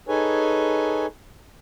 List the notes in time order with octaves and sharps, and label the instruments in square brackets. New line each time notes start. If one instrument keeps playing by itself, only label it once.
[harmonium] D#4 G#4 A4 B4 C#5 G#5